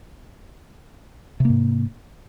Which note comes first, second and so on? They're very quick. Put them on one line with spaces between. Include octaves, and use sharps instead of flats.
C3 A#3 G#2